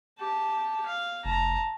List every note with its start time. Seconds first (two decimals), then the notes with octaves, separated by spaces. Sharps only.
0.19 G4 A5
0.86 F5
1.25 F1 A5 A#5